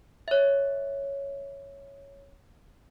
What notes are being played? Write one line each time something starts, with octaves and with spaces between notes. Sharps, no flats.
C#5 E5